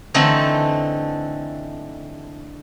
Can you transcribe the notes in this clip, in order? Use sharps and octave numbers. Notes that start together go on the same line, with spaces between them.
D3 E3 A3 C4 D#4